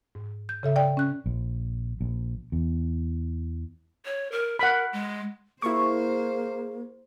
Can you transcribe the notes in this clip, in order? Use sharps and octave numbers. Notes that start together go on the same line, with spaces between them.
G#2
G6
C#3 A4 E5
D5 G5
C#4 F#6
A#1
A#1
E2
C#5
A#4
A#4 F#5 B5
G#3
A#3 E4 G#4 C5 C#6